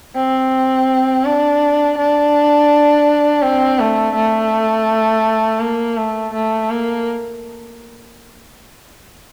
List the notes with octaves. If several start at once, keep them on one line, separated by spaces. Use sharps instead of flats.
C4
D4
D4
C4
A3
A3
A#3
A3
A3
A#3